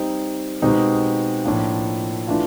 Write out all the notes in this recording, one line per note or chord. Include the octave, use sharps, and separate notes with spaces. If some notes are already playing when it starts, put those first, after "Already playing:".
Already playing: G3 C4 D#4
B2 G#3 C4 D#4 G4
A2 F3 A#3 D4 F4
E3 A3 D4 F4